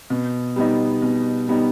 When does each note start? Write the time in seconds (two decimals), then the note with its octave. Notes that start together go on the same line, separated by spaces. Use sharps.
0.10 B2
0.56 G3 B3 D#4
1.02 B2
1.48 G3 B3 D#4